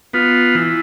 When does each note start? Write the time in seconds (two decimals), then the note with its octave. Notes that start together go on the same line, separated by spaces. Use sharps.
0.13 B3 F4
0.55 E3